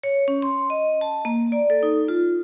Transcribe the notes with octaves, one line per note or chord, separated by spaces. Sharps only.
C#5
C#4
C6
D#5
A5
A#3
D5
A4
D#4
F4